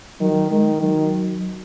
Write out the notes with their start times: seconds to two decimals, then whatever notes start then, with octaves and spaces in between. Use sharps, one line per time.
0.20 D#3 F#3
0.51 D#3 G#3
0.81 D#3 F#3